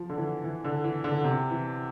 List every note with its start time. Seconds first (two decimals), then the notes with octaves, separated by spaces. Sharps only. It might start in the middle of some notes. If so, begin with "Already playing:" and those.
Already playing: F3
0.09 D3
0.18 E3
0.44 E3
0.64 D3
0.84 E3
1.04 D3
1.24 C3
1.50 E3